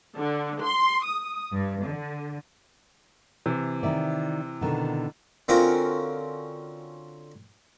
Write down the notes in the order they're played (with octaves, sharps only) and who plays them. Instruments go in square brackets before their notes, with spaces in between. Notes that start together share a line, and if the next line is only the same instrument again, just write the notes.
[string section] D3
C6
D#6
G2
D3
[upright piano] C3 E3
[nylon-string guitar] D#3 E4 D5
B2 D3 D#3
[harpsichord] D3 C4 C#4 F4 F#4 A#4